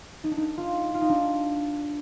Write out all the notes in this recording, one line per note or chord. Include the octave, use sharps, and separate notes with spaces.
D#4
D4
D#4
F4
F4
D#4
D4